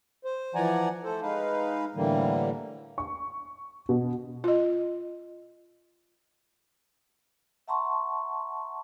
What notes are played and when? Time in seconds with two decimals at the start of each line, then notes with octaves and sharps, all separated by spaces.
0.25 C5
0.55 E3 F3 D5 F#5 G#5 A#5
1.04 A3 A4 C5
1.22 G#3 D#4 B4 F5
1.96 A2 D3 E3 G3 A#3
2.98 C#6
3.89 B2
4.44 F4 D#5
7.68 E5 F#5 A5 A#5 C6 C#6